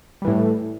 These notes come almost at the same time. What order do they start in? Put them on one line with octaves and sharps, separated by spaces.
G3 E3 A2